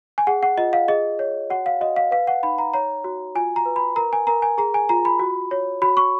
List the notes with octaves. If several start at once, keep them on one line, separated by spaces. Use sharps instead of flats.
G#5
G#4 F#5
F#5
F4 D#5
F5
G#4 D#5
C#5
F#4 F#5
F5
F#4 D#5
F5
B4 F5
F#5
D#4 B5
A#5
C#5 A#5
F#4
F4 G#5
A#5
B4
B5
A#4 A#5
G#5
A#4 A#5
G#5
G#4 A#5
G#5
F4 A#5
B5
F#4
C#5
F#4 B5
C#6